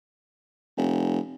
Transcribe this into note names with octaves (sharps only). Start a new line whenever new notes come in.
F1